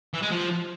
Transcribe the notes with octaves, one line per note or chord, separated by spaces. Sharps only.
E3
G#3
F3